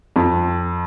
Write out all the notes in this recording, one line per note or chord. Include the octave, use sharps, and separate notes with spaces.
F2